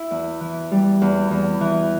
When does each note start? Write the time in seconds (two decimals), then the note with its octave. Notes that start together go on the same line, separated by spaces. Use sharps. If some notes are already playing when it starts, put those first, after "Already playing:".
Already playing: E4
0.11 E2
0.41 E3
0.71 G3
1.02 E2
1.31 E2
1.61 E3